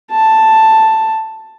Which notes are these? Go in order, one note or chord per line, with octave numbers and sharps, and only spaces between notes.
A5